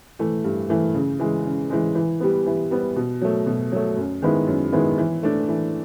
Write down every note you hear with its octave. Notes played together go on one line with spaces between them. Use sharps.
E3 A3
G2
E3 A3
C#3
E3 G#3
C#3
E3 G#3
E3
G3 B3
E3
G3 B3
B2
F#3 A3
B2
F#3 A3
F#2
D#3 G#3 B3 E4
F#2
D#3 G#3 B3 E4
E3
A3 D4
E3